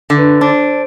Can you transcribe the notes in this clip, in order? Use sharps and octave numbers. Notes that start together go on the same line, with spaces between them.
D3
B4
D4 C5